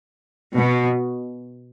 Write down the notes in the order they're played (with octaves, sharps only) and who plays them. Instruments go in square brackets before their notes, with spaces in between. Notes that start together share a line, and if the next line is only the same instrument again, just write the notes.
[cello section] B2